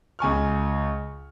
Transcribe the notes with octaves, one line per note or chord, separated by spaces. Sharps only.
C#2 G#5 C#6 F6